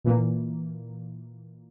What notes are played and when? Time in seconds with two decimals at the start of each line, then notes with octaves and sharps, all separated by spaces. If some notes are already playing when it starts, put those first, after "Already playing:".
0.04 A#2 E3 A#3